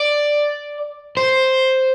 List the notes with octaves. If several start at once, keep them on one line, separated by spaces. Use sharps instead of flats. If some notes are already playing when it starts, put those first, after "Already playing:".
Already playing: D5
C5